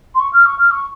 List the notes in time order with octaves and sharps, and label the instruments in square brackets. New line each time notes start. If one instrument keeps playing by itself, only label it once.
[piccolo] C6
C#6
F6
C#6
F6
C#6